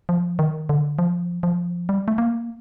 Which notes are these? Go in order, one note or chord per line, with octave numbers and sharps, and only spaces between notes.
F3
D#3
D3
F3
F3
G3
A3
A#3